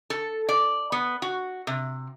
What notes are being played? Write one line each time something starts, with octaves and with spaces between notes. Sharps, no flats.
A4
D5
B3
F#4
C3